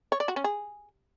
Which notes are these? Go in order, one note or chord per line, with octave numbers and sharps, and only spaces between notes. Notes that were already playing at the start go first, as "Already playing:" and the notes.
C#5
D5
F#4
C#4
G#4